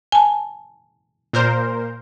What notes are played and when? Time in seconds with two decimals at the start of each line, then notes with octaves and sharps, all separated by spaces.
0.12 G#5 A5
1.33 A#2 A#4 C5